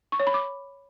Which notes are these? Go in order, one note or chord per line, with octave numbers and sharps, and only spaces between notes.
C#6
C#5
B5
D6